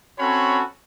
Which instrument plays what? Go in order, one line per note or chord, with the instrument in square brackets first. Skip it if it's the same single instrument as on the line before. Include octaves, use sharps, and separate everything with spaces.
[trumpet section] C4 C#4 F#4 A4 C#5 B5